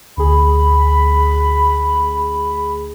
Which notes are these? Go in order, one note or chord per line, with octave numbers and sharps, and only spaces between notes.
D2 G#4 B5